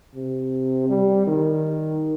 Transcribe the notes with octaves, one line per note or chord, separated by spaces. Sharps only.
C3
G3
D#3